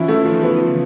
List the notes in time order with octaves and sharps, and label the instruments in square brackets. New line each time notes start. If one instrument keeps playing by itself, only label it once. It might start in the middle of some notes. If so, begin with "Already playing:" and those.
Already playing: [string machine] E3 [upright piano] F3 C#4 E4
[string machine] D#3 [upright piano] A3
[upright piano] F3
[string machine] C#3 [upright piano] B3
[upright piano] F3